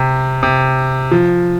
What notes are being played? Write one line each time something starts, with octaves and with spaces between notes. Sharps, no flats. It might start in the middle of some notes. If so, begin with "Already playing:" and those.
Already playing: C3
C3
F3